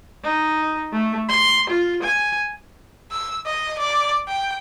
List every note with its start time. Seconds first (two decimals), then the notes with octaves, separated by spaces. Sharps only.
0.24 D#4
0.92 A3
1.29 C6
1.70 F4
2.03 G#5
3.11 E6
3.46 D#5
3.79 D5
4.28 G5